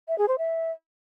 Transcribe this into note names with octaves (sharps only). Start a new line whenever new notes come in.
E5
G#4
C5
E5